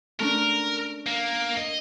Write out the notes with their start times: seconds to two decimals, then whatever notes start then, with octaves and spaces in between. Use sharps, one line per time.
0.20 A3 C#4 D4 A#4
1.07 A#3
1.57 D#5